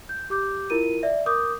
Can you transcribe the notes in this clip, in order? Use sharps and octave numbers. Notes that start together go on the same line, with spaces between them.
G6
G4 D6 G6
E4 F4 A#4 D#7
D5 E5
A#4 D6 D#6 G6